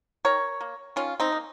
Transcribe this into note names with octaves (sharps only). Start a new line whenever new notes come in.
D#3 A#4 C#5
A#3
D#3 C#4 F4
C4 D#4
A#3